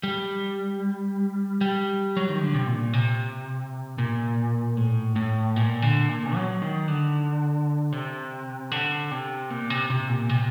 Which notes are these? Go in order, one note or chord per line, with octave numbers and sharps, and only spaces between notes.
G3
G3
F#3
D#3
D3
C3
A#2
C3
A#2
A2
A2
A#2
D3
A#2
F#3
D#3
D3
C3
D3
C3
A#2
C3
C3
A#2
C3